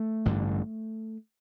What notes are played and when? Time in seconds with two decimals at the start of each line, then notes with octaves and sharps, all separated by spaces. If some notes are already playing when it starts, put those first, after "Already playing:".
Already playing: A3
0.25 A1 G2 D3